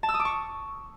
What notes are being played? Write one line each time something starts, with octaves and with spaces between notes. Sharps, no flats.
A5
E6
D#6
D6
C#6